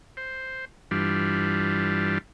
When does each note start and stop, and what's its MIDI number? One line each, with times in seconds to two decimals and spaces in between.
0.17 0.65 72
0.91 2.18 43
0.91 2.18 52
0.91 2.18 55
0.91 2.18 62
0.91 2.18 65